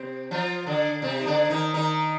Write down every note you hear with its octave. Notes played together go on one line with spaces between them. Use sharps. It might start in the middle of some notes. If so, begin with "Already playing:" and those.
Already playing: C3 C4
F3 F4
D3 D4
C3 C4
D#4
D3 D4
D#3 D#4
D#3 D#4